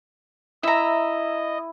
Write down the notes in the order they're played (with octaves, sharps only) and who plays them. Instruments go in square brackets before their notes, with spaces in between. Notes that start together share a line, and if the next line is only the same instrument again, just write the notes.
[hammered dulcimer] E4 [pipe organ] D#5 [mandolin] E5 A#5